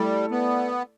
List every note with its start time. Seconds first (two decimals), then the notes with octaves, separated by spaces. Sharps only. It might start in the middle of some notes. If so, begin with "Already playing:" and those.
Already playing: G3 A3 E4 A4 D5
0.31 B3